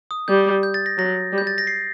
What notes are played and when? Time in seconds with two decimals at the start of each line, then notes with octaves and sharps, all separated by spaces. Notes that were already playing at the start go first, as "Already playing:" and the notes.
0.11 D#6
0.28 G3 G6
0.63 G6
0.74 A6
0.86 A#6
0.98 F#3 A#6
1.33 G3
1.38 G6
1.47 A6
1.58 A#6
1.67 C7